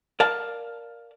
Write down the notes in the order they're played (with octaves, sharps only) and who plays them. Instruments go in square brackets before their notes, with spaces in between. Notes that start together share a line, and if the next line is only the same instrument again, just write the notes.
[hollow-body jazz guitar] A#4 D5 F5 A5